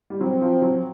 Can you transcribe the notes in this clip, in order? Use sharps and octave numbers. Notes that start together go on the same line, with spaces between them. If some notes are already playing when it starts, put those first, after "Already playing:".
G3
F#3 C4
F3
F#3